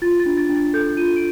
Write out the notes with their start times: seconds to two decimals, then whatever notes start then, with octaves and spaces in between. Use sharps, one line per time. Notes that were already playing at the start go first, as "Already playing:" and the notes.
0.02 F4 A6
0.20 A6
0.26 D4
0.37 A6
0.49 D4
0.56 A6
0.74 A4 G6
0.97 F4 D#7
1.16 D7